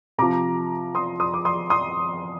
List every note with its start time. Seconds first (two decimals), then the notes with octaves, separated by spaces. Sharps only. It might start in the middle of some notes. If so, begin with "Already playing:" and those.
0.18 C3 F3 A#5 D6
0.95 C6 D#6
1.20 C6 D#6
1.34 D6
1.45 C6 D#6
1.70 C6 D#6